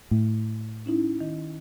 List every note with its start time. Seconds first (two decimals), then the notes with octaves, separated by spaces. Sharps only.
0.11 A2
0.86 C#4 D#4 E4
1.21 D#3